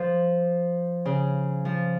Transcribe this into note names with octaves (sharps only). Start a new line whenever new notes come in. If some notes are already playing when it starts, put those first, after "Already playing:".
Already playing: F3
C#3
F3